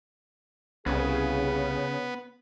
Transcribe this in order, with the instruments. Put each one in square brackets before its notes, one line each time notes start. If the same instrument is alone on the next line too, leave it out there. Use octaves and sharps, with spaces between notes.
[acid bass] C2 [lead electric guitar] C#3 [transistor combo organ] B3 [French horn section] E4 G4 G#4